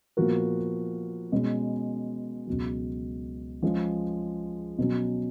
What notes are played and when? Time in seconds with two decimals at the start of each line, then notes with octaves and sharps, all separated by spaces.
0.17 A#2 F3 B3 F#4 A#4
1.32 B2 G#3 C#4
2.47 C#2 B2 F#3
3.62 F3 G#3 C#4 G#4
4.78 B2 F#3 C#4